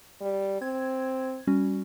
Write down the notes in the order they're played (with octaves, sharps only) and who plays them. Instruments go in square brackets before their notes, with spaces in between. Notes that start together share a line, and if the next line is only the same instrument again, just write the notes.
[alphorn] G3
[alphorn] C4 [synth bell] G#6
[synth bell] G3 C#4 F#4